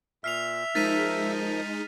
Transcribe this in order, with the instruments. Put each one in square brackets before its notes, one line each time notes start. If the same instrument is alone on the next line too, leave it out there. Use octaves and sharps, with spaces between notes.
[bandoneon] A#2 [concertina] E5 [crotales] F6 C7 F7
[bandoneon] F3 A#4 [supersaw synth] G#3 D#4 [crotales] A6 B6 D#7